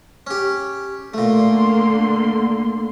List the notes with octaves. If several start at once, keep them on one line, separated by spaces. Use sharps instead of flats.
C#4 G4
A#2 D3 A3 A#3 C6